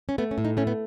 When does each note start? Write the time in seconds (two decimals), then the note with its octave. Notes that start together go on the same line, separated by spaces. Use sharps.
0.09 C#4
0.18 A3 B3
0.31 C#4
0.38 A2
0.45 D#4
0.57 A3 C#4
0.67 B3